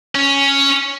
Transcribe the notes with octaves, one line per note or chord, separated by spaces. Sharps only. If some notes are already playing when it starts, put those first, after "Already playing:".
C#4